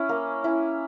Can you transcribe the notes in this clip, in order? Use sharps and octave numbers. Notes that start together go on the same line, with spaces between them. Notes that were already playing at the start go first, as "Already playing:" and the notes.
Already playing: C#4 E4
A#3
C#4 E4